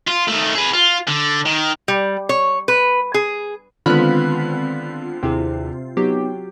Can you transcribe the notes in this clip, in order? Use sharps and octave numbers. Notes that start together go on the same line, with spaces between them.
F4
D#3 A3
G#4 B4
F4
D3
D#3
G3
C#5
B4
G#4
D3 D#3 G#3 B3 C4 F4 B5 F#6
D#2 C3 E4 G#4
F#3 B3 D#4 G4